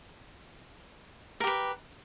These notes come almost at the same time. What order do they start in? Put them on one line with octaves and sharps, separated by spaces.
A#4 G4 B4